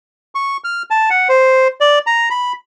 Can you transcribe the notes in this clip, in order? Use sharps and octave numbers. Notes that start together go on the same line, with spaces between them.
C#6
F6
A5
F#5
C5
D5
A#5
B5